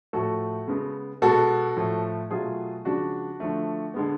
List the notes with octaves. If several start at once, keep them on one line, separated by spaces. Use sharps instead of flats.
A2 F3 A3 F#4 A4
C#3 G#3 B3
B2 G#3 B3 F#4 A4
A2 F3 A3
B2 F#3 A3 F4 G#4
C#3 F3 G#3 D4 F#4
D3 F3 A3
D3 G#3 B3